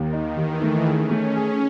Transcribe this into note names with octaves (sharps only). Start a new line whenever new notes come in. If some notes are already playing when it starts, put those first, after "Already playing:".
Already playing: D#2 D#3
D#4
D#2 E3
A3
C#4 G#4
A3
C#4 G#4